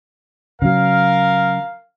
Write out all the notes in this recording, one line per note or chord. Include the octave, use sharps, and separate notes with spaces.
C#3 F#3 A#4 F5